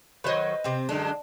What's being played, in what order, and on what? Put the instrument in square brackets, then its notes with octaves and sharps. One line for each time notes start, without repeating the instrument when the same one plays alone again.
[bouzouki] D#3 F#3 [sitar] B4 C5 D#5
[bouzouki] C3 C4
[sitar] F#2 D3 G#3 [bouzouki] D4